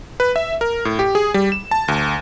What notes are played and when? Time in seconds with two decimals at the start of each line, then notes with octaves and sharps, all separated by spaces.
0.20 B4
0.36 E5
0.61 A#4
0.85 A2
0.99 G4
1.15 G#4
1.34 G3
1.52 E7
1.71 A5
1.88 D2